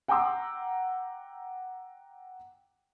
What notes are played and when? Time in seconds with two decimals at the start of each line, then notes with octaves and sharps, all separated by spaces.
0.08 F#5 G5 A#5 C6 D6 E6